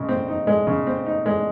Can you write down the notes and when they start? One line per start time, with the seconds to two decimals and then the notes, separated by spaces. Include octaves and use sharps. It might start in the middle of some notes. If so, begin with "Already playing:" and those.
Already playing: C#3 G#3
0.09 C4
0.28 D#4
0.47 G#3
0.67 C#3
0.87 C4
1.06 D#4
1.26 G#3